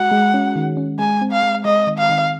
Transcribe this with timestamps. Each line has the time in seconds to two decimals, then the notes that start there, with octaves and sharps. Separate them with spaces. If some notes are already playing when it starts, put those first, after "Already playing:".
Already playing: G#3 F#4 F#5
0.11 G#3
0.34 C#4
0.56 D#3
0.77 C#4
0.99 G#3 G#5
1.21 C4
1.32 F5
1.43 G#3
1.65 G#3 D#5
1.87 D#3
1.99 F5
2.10 D#3